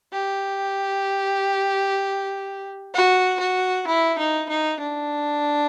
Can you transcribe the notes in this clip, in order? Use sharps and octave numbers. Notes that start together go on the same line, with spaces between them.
G4
F#4
F#4
E4
D#4
D#4
D4